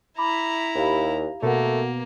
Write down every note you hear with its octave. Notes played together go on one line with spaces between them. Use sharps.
E4 A#5 B5 D6
D#2 G4 F5
B2 A3 A#3 F#4 A#4 F#5